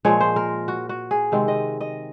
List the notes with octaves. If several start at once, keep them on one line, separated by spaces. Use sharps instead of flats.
A#2 F3 G#3 C#5
C5
A#4
F#4
F#4
G#4
C3 D#3 G#3 C4
D#5
D#5